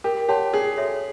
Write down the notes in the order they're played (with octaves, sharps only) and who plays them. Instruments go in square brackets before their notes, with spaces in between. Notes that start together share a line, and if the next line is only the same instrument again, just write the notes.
[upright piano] G4 [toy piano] A#4
[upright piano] G4 [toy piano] C#5 F#5 A5 C6
[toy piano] C#4 [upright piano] G#4
[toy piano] F#4 A4 C#5 E5